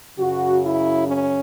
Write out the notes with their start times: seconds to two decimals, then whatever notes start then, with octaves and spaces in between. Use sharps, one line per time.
0.18 F#2 C#3 F#3 F#4
0.63 E4
1.07 C#4